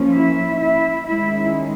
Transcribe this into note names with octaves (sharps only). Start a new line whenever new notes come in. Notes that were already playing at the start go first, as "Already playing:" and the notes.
Already playing: F3 A#3 C#4
E4 E5
E4 E5
D#3 G#3 C#4 E4 E5